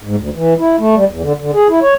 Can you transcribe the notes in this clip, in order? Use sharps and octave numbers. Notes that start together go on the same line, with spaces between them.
G#2
D2
E3
E4
A3
G3
E2
D3
D3
G#4
E4
C#5